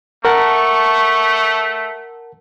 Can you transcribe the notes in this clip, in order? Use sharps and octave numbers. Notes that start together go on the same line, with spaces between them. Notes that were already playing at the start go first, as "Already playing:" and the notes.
A3 A#4 F#5 A5 C#6